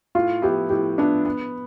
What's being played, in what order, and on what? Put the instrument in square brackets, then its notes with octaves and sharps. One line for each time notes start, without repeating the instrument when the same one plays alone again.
[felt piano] A2 [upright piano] F4
[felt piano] F3 B3 E4 [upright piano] G4
[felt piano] A2 [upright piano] G4
[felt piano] F3 B3 E4 [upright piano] D4
[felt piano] B3